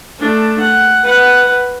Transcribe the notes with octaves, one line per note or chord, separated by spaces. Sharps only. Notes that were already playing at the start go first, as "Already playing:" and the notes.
A3 D4
F#5
B4 F#5